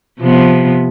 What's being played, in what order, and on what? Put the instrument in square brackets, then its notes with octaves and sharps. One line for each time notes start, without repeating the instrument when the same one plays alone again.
[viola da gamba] C3 F3 B3